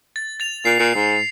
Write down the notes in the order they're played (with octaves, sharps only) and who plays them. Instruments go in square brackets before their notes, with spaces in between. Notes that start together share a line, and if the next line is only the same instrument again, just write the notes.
[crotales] A6
A6 F7
[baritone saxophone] A#2 [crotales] C7
[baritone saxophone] A#2 [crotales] C#7
[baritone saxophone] G#2